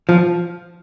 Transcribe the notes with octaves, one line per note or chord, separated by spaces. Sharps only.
F3